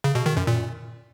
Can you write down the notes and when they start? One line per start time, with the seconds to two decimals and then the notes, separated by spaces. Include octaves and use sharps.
0.04 C#3
0.15 B2
0.26 D#3
0.37 F#2
0.47 A#2